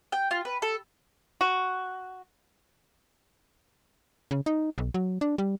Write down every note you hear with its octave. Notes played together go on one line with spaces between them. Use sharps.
G5
F4
B4
A4
F#4
C#3
D#4
B1
F#3
D4
G3